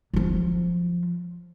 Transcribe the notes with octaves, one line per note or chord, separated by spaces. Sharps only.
F3 F#3